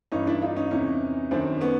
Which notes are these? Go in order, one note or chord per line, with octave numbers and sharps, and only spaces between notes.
G2 E3 C#4 D#4
D4 E4
D#4 F4
C#4 D#4
E2 C3 E3 C#4 D#4
F#2 D#3 C4 D4
B3 C#4